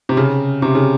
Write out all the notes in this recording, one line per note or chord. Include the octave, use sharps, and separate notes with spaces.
C3
C#3
C3
C#3